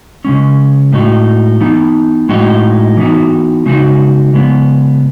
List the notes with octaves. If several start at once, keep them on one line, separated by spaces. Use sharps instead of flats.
C#3 G#3 C#4
A2 G#3 D#4 F#4
E3 B3 D#4
A2 G#3 D#4 F#4
E3 B3 D#4 F#4
C#3 G#3 D#4 F#4
C#3 G#3 B3